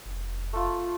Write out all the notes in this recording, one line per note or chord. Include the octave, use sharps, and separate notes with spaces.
F1
A3 F4